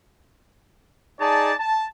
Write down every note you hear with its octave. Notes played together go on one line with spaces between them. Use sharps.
D#4 G#4 D5 A5
A5